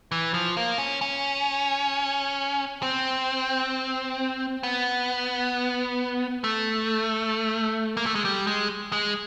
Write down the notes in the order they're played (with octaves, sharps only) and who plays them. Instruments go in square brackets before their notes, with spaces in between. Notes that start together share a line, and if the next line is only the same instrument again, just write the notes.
[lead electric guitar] E3
F3
A#3
C#4
C#4
C4
B3
A3
A#3
A3
G#3
G3
G#3
G#3